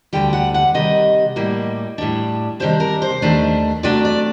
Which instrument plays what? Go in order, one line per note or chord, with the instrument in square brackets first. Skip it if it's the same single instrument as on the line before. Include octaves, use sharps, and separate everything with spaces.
[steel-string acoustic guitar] D2 D3 G3 G5
F#5
F#5
C3 D#3 G3 D#5
A2 G3 A#3
A2 G3 D4
C3 D#3 G3 D4 C5
A#4
C5
D#2 D#3 A3 D4
C3 F#3 A3 D4 D5
D5